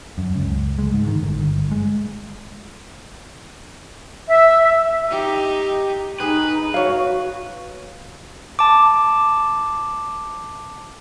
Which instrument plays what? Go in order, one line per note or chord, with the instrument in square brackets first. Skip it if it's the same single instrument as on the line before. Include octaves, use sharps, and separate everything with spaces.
[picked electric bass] F#2
C#2
G#3
G#2
D#3
G1
G#3
[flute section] E5
[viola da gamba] D#4 G4
[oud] B2 G4 G#4 [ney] D#4 [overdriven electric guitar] B4
[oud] E4 C#5 [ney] F#4 [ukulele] F5
[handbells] A5 D6